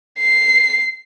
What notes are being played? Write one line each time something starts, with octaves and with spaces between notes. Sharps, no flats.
C7